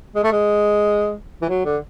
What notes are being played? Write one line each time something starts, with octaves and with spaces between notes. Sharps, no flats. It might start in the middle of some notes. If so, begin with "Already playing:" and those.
G#3
A3
G#3
E3
F#3
D3